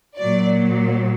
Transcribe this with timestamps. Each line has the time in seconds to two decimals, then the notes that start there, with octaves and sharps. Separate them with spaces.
0.18 A#2 F#3 D5